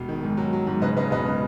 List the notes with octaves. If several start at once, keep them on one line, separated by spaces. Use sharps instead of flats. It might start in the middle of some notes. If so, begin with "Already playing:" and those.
Already playing: E1
D#3
G#2
F#3
F#3
G#2
C#3 B4 D#5
C#3 B4 D#5
E1 B4 D#5
C#3